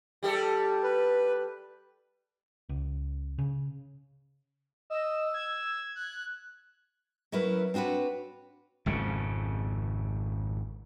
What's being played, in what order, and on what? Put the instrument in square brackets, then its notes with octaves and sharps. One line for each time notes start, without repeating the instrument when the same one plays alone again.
[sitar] G3 G4 A4
[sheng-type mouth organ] B4
[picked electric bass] C#2
C#3
[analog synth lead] D#5 [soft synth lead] E6
[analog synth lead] G#6
[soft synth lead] F#6
[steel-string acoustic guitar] F#3 C#4 E4 A#4 B4
C4 D4 F#4 B4 C#5
[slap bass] G#1 F2 C#3